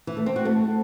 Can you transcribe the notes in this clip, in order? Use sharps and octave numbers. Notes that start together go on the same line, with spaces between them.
E3
A3
C4
F#4
A3